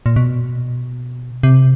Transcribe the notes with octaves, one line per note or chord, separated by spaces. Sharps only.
A#2
B2
C3